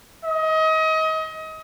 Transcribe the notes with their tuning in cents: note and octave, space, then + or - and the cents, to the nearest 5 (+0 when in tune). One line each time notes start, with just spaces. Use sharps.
D#5 +30